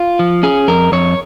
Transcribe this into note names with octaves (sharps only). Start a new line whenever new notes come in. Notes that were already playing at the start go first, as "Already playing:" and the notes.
Already playing: F4
F3
C#4 G#4
F2 A#4
F2 C#5